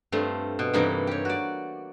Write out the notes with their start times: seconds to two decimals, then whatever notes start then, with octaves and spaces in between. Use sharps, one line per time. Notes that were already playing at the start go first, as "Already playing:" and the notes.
0.12 G2 A3 C4 F4
0.59 B2
0.73 G2 C3 E3 A#3 D#4 E4
1.07 G4 C#5
1.25 F#4 D5